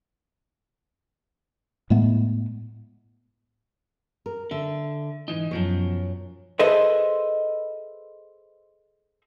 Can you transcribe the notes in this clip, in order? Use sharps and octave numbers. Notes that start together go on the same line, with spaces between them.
A2 G#3 A3 B3
A#4
D3 E5
G#2 E3 D#4
F#2 B2 F3 F#3 C#5
G#4 A4 B4 C5 D#5 E5